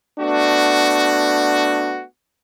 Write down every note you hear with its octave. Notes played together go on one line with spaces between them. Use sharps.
A3 B3 D4 F#4